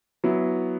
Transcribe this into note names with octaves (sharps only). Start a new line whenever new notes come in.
F#3 B3 E4